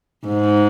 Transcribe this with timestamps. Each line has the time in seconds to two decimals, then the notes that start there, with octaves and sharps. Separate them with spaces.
0.27 G#2